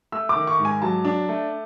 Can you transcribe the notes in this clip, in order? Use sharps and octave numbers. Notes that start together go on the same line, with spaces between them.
A3 E6
D6
D#3
C#6
G#2
G#5
F#3 A5
D4
A3